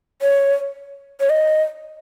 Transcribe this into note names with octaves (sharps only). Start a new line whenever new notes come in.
C#5
C#5
D#5